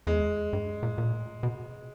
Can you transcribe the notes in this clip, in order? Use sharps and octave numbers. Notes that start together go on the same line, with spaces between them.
E2 G#3
G2
A#2
A#2
B2